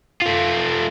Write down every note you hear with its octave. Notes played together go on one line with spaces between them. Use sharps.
A3 F4